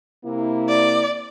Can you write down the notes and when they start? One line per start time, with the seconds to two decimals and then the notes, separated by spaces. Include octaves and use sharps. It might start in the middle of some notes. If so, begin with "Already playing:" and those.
0.25 C3 A#3 E4
0.69 D5